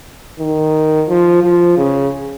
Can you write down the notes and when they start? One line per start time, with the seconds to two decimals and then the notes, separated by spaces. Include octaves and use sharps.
0.40 D#3
1.09 F3
1.43 F3
1.77 C#3